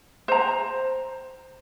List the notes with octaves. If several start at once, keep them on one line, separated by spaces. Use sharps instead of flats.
C5 A#5